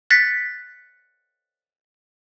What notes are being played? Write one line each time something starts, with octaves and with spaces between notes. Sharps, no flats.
F#6 A6 B6 C#7